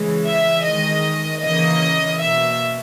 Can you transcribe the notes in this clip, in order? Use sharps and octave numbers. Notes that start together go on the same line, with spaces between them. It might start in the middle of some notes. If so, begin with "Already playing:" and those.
Already playing: C#3 E3 G#3
E5
D#3 G#3 D#5
C#3 E3 A#3 D#5
B2 A#3 E5